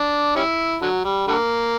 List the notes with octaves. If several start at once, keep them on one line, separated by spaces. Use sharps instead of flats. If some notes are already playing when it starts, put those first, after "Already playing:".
Already playing: D4
G3 C#4 E4
D3 F#3
G3
D3 G3 A#3